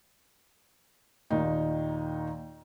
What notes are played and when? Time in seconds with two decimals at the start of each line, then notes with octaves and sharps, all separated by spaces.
1.30 D#2 A#2 D#3 D#4